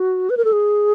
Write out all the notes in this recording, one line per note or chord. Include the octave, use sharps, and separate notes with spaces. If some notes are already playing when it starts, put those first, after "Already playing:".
Already playing: F#4
B4
A#4
A4
G#4